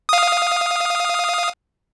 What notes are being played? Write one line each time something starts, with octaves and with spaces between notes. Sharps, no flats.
F5 D#6